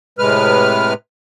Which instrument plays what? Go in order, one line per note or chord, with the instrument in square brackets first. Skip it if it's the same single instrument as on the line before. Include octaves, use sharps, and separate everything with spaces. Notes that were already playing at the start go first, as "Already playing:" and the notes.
[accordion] A2 C3 G#3 B4 F6